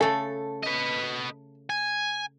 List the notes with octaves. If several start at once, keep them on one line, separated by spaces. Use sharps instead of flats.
C#3 A3 A4
B4 D#5
G#5